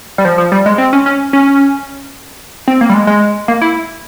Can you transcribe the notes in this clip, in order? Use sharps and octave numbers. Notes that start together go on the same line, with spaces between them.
G3
F3
F3
G3
G#3
C4
C#4
C#4
C#4
C4
A#3
G3
G#3
G#3
A#3
E4